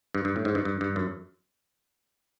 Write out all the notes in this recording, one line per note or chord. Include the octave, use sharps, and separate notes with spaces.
G2
G2
A2
G#2
G2
G2
G2
F#2